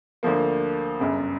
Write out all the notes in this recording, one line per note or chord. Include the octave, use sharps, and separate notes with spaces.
D2 D3 F3 A#3
G1 F#2 C#3